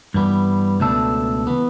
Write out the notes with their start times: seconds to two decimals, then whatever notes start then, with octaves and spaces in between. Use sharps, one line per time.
0.14 G2 E3 G3 B3
0.80 C#2 B2 A3 D4 A4
1.47 E3 B3